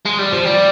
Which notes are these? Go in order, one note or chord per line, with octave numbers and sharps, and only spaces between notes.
G#3
G3
F3
G3